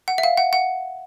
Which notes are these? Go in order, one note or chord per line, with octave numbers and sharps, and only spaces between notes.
F#5
E5
F5
F#5
F#5